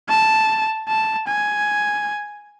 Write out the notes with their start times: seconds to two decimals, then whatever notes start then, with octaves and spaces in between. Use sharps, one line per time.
0.09 A5
0.88 A5
1.28 G#5